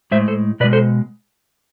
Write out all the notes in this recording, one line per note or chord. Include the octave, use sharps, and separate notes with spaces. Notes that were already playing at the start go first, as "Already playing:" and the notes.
A2 G#3 C5 E5
A4 C5
B2 G#3 B4 D5
A4 C5